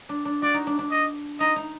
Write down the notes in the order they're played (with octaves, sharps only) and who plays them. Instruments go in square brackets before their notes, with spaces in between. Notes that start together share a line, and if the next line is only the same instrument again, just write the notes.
[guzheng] D4
D4
[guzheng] F#4 [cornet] D5
[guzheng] D#4
D4
D4
[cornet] D#5
[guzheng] D#4 [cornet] D#5
[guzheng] D#4